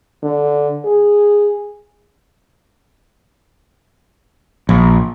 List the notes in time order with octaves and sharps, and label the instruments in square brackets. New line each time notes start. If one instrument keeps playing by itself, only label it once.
[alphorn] D3
G#4
[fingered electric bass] A#1